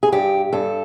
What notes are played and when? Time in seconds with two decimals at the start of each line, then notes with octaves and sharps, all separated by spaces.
0.03 G#4
0.12 G2 G4
0.53 G2 A4